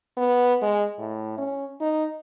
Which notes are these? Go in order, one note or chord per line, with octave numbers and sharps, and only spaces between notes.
B3
G#3
A2
C#4
D#4